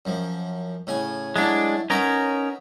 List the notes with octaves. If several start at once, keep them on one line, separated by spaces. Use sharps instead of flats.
F#2 F3
A2 C#3 G#5
F#3 G#3 A3 D4 E4
B3 C#4 D#4 A#4 C#5 E5